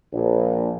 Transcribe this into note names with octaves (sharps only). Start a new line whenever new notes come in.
A#1